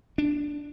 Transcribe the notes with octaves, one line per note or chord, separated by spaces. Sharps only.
D4